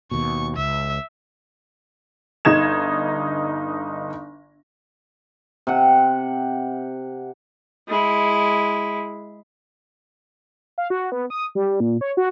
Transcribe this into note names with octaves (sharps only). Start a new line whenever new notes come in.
D#2 B2 C#6
C#2 E5
G1 D#4 G#6 E7
C3 F#5
G#3 E4
F5
F#4
B3
D#6
G3
A#2
C#5
F#4